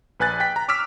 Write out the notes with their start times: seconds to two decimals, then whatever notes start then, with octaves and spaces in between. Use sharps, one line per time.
0.20 A#1 B4 G#5 F#6 A6
0.40 G5 B6
0.56 A#5
0.68 C#6 D6 E6 F6 B6